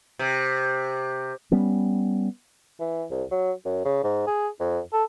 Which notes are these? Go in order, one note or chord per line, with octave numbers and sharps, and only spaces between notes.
C3
G3 B3 C#4
E3
C2
F#3
F#2
C#3
G#2
G#4
F2
A4